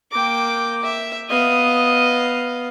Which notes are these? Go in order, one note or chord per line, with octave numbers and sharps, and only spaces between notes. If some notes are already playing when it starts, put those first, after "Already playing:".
A#3 G5 D6
E5
B3 D#5 F5